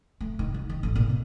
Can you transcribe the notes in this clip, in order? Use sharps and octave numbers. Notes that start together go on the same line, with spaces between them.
A3
D#3
F#3
D#3
A1
A#2
B2